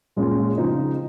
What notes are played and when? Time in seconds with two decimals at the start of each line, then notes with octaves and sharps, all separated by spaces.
0.16 A#2 G#3 C#4 F4
0.57 C#3 F3 C4 D#4